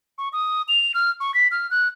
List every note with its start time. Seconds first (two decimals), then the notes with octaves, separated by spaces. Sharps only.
0.18 C#6
0.33 D#6
0.68 F7
0.94 F6
1.20 C#6
1.34 B6
1.51 F6
1.70 F#6